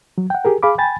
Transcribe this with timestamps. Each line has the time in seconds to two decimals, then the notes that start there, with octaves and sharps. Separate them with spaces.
0.18 F#3
0.30 F#5 G5
0.45 G4 G#4 A#4
0.63 G#4 F5 B5 D6
0.78 G5 G#5 B5 A6